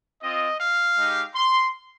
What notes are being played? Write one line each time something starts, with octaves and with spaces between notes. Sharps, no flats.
C4 F4 D#5
F5
G#3 D#4 G4
C6